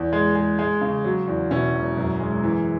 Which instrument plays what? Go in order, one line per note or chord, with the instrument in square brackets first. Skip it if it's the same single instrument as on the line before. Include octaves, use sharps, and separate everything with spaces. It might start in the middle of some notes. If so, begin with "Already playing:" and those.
Already playing: [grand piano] E2
G#3
G#3
G#3
C#3
F#3
E2
B2 C#4 E4
E1
F#2
G#3
E3